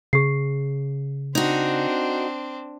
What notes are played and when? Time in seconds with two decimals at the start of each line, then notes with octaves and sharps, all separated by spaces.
0.13 C#3 G#4 C7
1.35 C4 D4 D#4 F#4